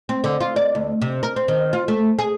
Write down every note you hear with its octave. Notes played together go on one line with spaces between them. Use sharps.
C4
D3
F4
D5
D2
C3
A#4
C4
D#3
F4
A3
G#4